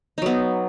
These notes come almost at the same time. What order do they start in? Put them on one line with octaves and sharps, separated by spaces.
D#4 F#3 B3